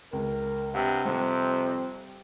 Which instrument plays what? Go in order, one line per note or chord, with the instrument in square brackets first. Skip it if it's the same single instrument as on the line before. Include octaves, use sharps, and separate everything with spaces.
[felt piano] C#2 [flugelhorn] A#4
[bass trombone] G2 [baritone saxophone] C3 [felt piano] F#5 E6
[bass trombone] F2 [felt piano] G3 [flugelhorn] C4